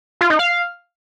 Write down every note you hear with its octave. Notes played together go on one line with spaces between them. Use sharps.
F4
D#4
F5